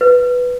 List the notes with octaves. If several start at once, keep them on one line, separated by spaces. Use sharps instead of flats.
B4